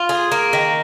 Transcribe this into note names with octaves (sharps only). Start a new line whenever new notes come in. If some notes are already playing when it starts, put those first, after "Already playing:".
Already playing: F4
G#4
A#3
D#3